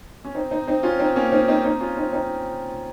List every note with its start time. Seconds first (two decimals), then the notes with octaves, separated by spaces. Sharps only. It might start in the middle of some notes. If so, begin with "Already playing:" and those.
0.24 C#4
0.35 C4 D#4
0.51 C4 D#4
0.67 C4 D#4
0.83 C#4 F4
0.99 C4 D#4
1.16 A#3 C#4
1.32 C4 D#4
1.48 C4 D#4
1.64 C4 D#4
1.80 C#4 F4
1.97 C4 D#4
2.13 C4 D#4